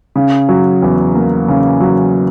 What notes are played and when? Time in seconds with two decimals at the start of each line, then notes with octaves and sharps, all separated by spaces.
0.16 C#3
0.49 F#3
0.83 E2
1.15 A#3
1.48 C#3
1.80 F#3